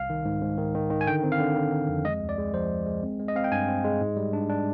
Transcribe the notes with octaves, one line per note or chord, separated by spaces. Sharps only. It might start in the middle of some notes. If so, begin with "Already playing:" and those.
Already playing: C2 F5
D#3
G#2
G#2
D#3
D#3
D#3
G#5
D3 G5
C4
F5
D3
D3
D3
F2
G#3 D#5
D2
D5
G#3
F3 C5
G#3
G#3
C4
G#3
D#5
C4 F5
G5
G2 G#5
C4
G#3
G#2
G3
D4
D4